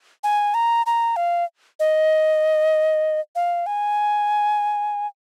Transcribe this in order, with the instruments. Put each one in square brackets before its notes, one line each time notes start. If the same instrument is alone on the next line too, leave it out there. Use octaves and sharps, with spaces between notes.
[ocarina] G#5
A#5
A#5
F5
D#5
F5
G#5